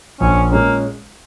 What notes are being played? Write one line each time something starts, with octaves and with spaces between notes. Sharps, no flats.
A#1 C#4
A#2 G#3 A#3 C#4